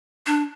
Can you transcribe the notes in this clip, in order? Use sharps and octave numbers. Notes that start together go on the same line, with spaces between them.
D4